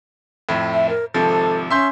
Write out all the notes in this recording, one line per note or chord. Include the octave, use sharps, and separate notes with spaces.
F2 A2
E5
A#4
G#1 C3 F3 A4
C#4 E5 C6 G6